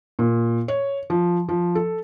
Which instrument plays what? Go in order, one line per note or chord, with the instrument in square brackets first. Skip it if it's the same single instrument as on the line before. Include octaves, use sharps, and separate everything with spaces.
[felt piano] A#2
C#5
F3
F3
A4